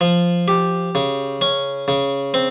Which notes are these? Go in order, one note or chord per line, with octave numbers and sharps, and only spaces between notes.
F3
G4
C#3
C#4
C#3
C4